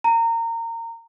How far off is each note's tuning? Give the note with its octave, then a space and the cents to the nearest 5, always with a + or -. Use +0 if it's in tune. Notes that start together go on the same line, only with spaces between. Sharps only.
A#5 -25